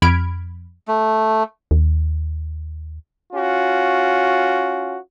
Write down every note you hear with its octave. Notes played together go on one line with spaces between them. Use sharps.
F2 B5 F6 G#6 D7
A3
D#2
C#4 F4 F#4